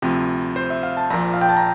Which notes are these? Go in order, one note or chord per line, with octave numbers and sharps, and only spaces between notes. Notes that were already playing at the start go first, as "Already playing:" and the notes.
D2 C3 F3
C5
E5
F5
A5
A#1 A#2 F3 A#5
F5
G5
A5
A#5